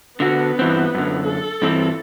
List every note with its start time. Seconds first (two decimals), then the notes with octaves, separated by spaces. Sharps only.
0.20 D3 B3 F#4
0.59 G2 E3 C4
0.95 F#2 D3
1.26 A4
1.62 G2 E3 C4